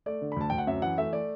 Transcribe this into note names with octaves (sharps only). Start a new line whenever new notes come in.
A3 D5
D3
B5
D2 A5
D2 G5
F#5
F#2 E5
E3 F#5
A3 E5
A3 D5